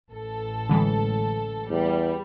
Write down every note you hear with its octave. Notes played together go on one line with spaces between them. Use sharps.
A1 A4
D3 E3 G#3
E2 G3